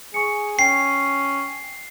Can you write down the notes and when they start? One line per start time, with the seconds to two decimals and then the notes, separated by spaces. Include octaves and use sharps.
0.14 G#4 C#6 C#7
0.59 C#4 G5 C7